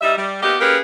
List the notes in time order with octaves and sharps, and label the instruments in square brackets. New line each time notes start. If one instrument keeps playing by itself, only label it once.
[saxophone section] G3 D#4 E5
G3
A#3 B3 D#4 G4
A#3 C#4 G4 G#4 A#4 B4